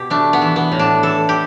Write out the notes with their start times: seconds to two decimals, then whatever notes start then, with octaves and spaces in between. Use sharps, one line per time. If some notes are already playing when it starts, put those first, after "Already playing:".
Already playing: B2 G4
0.10 A3 D4
0.33 B3
0.41 E3
0.56 B3
0.72 A2
0.79 D4
1.03 E3 A4
1.29 G4